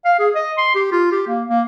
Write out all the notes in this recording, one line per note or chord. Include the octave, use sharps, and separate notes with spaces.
F5
G#4
D#5
C6
G4
F4
G4
A#3
A#3